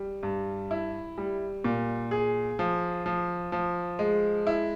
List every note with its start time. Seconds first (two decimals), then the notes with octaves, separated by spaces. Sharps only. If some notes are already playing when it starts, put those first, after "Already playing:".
Already playing: G3
0.23 G2
0.71 E4
1.18 G3
1.64 A#2
2.11 G#4
2.59 F3
3.06 F3
3.52 F3
3.99 G#3
4.47 E4